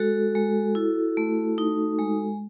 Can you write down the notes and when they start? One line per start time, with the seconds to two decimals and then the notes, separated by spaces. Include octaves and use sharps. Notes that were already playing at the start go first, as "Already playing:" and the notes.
Already playing: G#3 F#4 A4
0.35 G#3
0.75 E4
1.17 A3
1.58 D#4
1.99 G#3